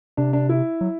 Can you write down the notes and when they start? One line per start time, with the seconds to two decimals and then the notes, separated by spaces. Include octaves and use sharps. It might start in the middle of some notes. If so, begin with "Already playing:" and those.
0.17 C3 D4
0.33 D4
0.49 E4
0.81 F#3